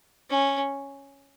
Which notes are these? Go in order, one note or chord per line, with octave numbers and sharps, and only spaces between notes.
C#4